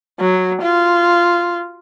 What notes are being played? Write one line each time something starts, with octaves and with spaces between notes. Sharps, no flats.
F#3
F4